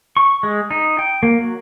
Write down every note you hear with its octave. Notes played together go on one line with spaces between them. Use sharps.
C#6
G#3
D#4
G5
A#3
F#3